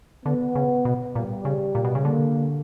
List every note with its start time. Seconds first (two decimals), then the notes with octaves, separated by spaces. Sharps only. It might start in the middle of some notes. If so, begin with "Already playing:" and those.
0.25 D3 B3
0.55 C#3
0.85 B2
1.15 A#2 G3
1.45 C#3
1.75 A#2
1.85 B2
1.95 C#3
2.05 D3 A#3